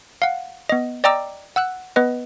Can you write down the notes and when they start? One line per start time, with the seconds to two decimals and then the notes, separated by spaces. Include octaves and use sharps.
0.22 F5 F#5
0.69 B3 D#5
1.04 D5 D#5 G5 A#5 D6 E6
1.56 F#5 E6 F#6
1.96 B3 B4 D#5